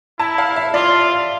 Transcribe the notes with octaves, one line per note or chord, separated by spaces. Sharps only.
E4 A5
F5
E5
F4 D5